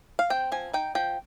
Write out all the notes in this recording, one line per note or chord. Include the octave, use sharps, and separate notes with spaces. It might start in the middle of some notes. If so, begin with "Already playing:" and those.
F5
C4 G5
F3 G#5
D#4 G5
F3 G5